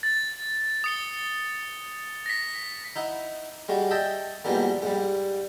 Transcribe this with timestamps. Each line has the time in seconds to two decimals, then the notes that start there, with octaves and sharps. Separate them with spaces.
0.03 A6
0.84 D#6 C#7 G7
2.26 A#6 B6
2.96 D#4 E4 F#5
3.69 G3 G#3 F#4
3.91 D#5 E5 G5 A5
4.45 G#2 B2 E3 F3 G3 A#3
4.82 G#2 G3